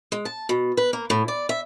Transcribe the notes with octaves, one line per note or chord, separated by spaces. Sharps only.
G#3
A5
B2
B4
A#3
A2
D5
E5